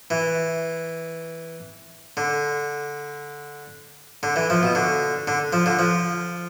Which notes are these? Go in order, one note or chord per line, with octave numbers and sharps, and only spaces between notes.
E3
D3
D3
E3
F3
B2
D3
D3
F3
D3
F3